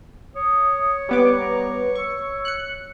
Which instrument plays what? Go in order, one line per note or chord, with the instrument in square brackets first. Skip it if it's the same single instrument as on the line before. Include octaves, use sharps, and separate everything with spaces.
[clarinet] C#5 [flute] D#6
[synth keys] G3 B3 D6 [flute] B4
[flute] A#5
B4
[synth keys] C#6 [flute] E6
[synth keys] F#6 C#7